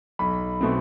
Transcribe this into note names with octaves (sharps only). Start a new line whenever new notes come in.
B1 B5
B2 A3 C4